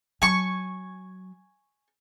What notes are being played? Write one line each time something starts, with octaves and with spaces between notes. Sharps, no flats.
F#3 G#5 C#6